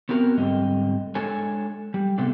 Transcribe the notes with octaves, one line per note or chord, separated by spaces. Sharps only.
B3 C4 F#4 A#4
G#2 D3 G3 C4 D#5
G#3 D4 A4 C#5 G#5
G3
C3 A3 B3 C4 D4